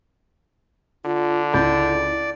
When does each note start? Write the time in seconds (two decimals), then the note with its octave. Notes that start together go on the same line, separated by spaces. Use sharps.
1.05 D3 F4
1.54 C#2 E4 D5 B5 G6